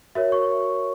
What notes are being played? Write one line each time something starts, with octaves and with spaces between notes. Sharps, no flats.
F#4 A#4 C#5 E5
C#6